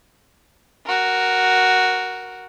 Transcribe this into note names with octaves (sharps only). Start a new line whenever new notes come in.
F#4 A#4